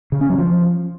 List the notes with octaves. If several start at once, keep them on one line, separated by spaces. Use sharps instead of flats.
C#3
C#4
F#3
F3